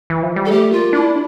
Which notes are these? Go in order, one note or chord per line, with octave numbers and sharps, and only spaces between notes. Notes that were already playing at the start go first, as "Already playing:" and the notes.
E3
F3
G3
A4
A3 G4
A#3 F4
D4 E4